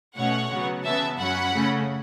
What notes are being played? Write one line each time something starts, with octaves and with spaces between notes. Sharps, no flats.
B2 A3 C#4 C#5 F#5
C#3 F#3 B3
C#3 E3 B3 E5 A5
F#2 F#3 C#4 F#5 B5
C#3 A3 C#4